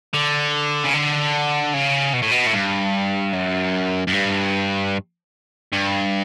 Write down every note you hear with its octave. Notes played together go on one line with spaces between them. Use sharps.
D3
C#3
D3
C#3
B2
A2
B2
A2
G2
F#2
F#2
G2
G2